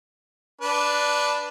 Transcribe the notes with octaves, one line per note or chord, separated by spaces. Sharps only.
D4 B4